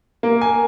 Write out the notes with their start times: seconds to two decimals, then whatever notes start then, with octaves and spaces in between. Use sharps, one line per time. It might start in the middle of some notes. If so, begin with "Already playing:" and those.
0.23 A#3
0.41 G#5